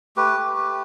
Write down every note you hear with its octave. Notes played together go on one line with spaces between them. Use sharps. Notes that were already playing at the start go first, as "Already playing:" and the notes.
A3 G4 B4
A3
A3